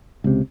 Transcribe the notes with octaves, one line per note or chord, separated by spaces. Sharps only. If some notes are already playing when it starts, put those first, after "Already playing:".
C#2 C3